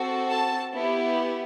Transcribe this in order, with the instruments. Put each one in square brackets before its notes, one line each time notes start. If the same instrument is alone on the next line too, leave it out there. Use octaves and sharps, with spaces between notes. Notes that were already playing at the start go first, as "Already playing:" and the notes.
Already playing: [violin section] C4 F#4 A4
A5
B3 E4 G4